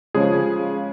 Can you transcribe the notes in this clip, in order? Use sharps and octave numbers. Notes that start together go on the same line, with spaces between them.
C#3 F3 G#3 C#4 G#4